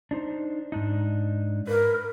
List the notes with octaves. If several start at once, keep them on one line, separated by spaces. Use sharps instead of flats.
D4 D#4 C5
G#2 D4 D#4
A#4 B4